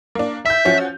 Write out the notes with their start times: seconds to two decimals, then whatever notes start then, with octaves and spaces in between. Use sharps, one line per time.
0.15 A#3 D4
0.46 E5 E6 G6
0.65 F3 C#4 F#4